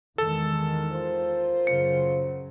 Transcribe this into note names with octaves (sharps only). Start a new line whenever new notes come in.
E2 D#3 G#3 A4
F4 A#4 C5
F#2 C#3 F#3 C#7